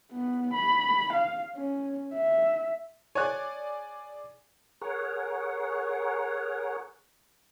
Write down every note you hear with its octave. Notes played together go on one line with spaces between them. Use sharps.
B3
B5
F5
C#4
E5
G#4 C#5 D5 G#5 F#6
G#4 A#4 C#5 F#5